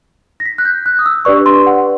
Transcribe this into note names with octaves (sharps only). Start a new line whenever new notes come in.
A#6
B6
F#6
G6
F#6
D#6
E6
D4 G4 B4 D5 C#6
C6
F#5